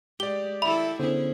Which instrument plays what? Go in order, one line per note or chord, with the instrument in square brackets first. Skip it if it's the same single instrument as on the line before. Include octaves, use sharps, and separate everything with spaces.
[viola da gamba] G#3 [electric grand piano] G4 D5 [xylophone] G7
[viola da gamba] D#3 E4 A4 [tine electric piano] E5 [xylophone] B5
[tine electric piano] D3 B3 C5 [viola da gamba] C#4 E4 G#4